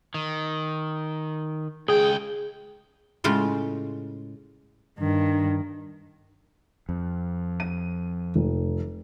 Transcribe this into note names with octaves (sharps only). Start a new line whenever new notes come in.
D#3
C#2 G#4 G5
A2 C#3 G#3 F4
G2 D#3 D4
F2
D#7
F1